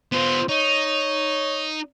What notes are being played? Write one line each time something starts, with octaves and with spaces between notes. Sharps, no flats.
B3 F4 C5
D#4 C#5